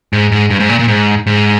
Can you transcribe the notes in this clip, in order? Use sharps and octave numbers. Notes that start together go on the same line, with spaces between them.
G#2
G#2
G2
G#2
A#2
A#2
G#2
G#2